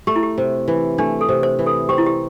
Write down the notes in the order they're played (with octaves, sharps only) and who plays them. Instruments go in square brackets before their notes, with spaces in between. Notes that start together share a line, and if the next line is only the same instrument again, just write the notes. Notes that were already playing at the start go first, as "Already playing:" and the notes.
[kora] A3 [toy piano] G4
[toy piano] E4
G4
[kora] C3
E3
[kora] A3 [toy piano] D4
[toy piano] A4
[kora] C3
[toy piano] C5
[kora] E3
[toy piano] A4
[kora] C4 [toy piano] G4
[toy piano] E4
G4